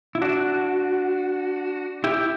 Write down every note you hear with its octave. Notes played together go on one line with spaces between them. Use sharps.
E4
D4 F#4
E4 G4